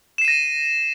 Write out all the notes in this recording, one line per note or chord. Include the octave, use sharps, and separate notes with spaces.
A#6 C7 D#7 E7